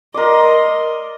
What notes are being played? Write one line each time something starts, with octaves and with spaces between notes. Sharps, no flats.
A#4 D5 D#5 C6